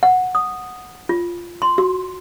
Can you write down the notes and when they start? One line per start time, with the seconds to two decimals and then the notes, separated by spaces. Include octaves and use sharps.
0.03 F#5
0.35 D#6
1.09 F4
1.62 C6
1.78 F#4